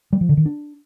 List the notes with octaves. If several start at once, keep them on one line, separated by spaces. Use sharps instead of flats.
G3
F3
D3
D#3
D4